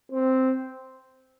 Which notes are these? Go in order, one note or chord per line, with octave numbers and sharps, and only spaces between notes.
C4